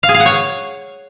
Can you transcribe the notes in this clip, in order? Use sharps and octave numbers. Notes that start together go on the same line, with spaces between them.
F5
G#4
F5
F#5
C#5